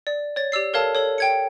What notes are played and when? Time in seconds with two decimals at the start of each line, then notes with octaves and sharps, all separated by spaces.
0.07 D5
0.36 C#5 A6
0.52 G4 D5 E6 C7
0.74 A4 A#4 C#5 F5 A5
0.95 A4 C#5
1.18 G5 G#6 C#7